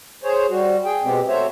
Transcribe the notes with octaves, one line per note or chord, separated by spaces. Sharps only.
G#4 C5 C#5
G3 F#4
G#4 G5
B2 G#3 B3 C4 G4
A3 C4 F#4 C5 C#5 E5